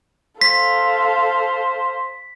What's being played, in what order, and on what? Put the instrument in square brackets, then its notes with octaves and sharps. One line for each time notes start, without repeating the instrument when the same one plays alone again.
[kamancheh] A4 F5 [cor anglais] C5 [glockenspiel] B6